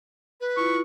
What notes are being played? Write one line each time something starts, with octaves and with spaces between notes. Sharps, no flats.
B4
E4 F4 C#6